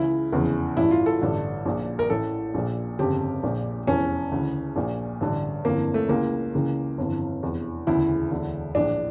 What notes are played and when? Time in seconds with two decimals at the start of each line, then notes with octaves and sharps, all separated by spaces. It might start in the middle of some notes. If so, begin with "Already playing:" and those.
Already playing: C#2 C#3 E3 E4
0.32 F1 E2 C#3 E3
0.77 A1 G2 E3 E4
0.91 F4
1.06 A4
1.21 A1 G2 D3
1.65 A#1 A#2
1.99 A#4
2.10 A1 A2 E3 A4
2.54 A#1 A#2
2.99 G1 F2 C#3 G4
3.43 A#1 A#2
3.87 F1 E2 E3 C#4
4.32 D2 C#3 E3
4.76 A#1 A#2
5.21 A1 G2 D3
5.65 G1 F2 E3 A#3
5.94 A3
6.09 C#2 C#3 E3 A#3
6.54 C#2 C#3 E3
6.98 G1 F2 E3
7.42 F1 E2 E3
7.86 E1 D2 C#3 E3 E4
8.31 E1 D2 D3
8.75 A#1 A2 E3 D4